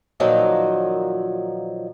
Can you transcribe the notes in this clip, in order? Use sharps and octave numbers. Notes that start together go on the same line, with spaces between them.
A#2 D#3 F3 F#3 A#3